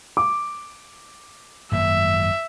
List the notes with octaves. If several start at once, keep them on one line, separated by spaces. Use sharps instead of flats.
D6
G#1 F#2 A#3 E5